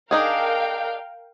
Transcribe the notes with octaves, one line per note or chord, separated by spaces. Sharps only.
D4 D#4 G#4 A#4 F5 G5